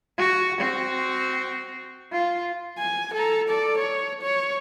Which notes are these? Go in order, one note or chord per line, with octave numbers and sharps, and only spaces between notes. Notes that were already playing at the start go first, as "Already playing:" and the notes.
F#4
C4 F#4
F4
G#5
A4 A#5
A4 D5
C#5
C#5